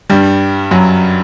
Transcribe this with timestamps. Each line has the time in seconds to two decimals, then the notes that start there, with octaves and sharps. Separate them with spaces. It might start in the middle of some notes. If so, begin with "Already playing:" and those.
0.10 G2 G3
0.71 F#2 F#3